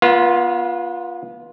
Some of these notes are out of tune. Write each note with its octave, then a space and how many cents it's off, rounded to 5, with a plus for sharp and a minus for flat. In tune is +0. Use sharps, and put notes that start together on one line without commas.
B3 -35 F4 +0